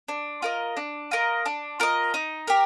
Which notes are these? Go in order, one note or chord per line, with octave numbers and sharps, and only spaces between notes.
D4
F4 A#4 D#5
D4
F4 A#4 D#5
D4
F4 A#4 D#5
D#4
G4 A#4